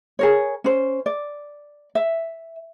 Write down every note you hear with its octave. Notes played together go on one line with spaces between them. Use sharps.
G#4 A#4 C#5
C#4 C5
D5
E5